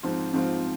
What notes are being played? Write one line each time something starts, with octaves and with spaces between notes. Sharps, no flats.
G#2 F3 C4 F4
G#2 F3 C4 F4